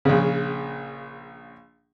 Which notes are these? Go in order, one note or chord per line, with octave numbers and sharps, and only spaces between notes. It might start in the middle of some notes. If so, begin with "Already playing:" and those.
A#1 C#3